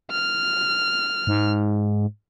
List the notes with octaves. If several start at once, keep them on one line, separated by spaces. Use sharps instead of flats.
F6
G#2